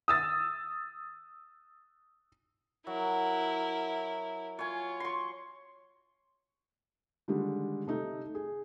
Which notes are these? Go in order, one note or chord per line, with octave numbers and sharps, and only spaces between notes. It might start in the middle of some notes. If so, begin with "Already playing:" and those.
D#6 E6 A6
F#3 E4 A#4
F4 C#5 G#5
C6 C#6
D3 D#3 G3 G#3
C3 A3 D#4
G#4